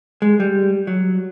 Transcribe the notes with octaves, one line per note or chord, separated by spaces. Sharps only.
G#3
G3
F#3